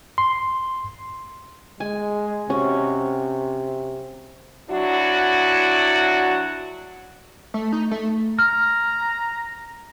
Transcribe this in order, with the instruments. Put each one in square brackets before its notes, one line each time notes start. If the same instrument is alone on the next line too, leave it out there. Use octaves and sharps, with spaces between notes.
[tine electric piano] C6
[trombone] G#3 [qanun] G#5
[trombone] C3 [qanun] C#4 F#4
[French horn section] F#3 D4 E4 F#4
[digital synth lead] A3
D#4
A3
[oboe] A#5 [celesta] F6